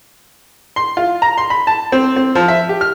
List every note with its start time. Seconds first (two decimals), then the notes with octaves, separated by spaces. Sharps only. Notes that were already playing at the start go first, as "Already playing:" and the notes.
0.76 C6
0.97 F4
1.22 A#5
1.38 C6
1.50 B5
1.67 A5
1.92 C4
2.16 C4
2.35 F3
2.48 E5
2.69 G4
2.81 F6